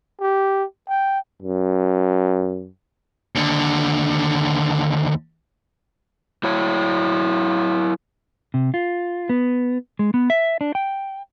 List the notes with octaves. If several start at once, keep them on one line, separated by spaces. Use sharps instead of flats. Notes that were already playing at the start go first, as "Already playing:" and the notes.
G4
G5
F#2
D#2 D3
F#3 E4 C#5
C3
F4
B3
G#3
B3
E5
D4
G5